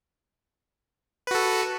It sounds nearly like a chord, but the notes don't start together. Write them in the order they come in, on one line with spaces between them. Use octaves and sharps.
B4 F#4 A4